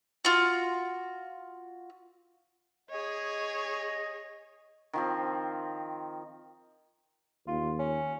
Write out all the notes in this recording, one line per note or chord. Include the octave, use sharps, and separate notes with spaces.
F4 F#4
G#4 C#5 D#5
D#3 F3 C4
D#2 F4
C#4